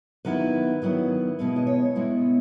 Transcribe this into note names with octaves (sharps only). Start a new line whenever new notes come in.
D#3 F#3 B3 E4 B4
D#3 F#3 B3 E4
B2 G#3 B3 E4 B4
D#5
C#5
B2 G#3 B3 E4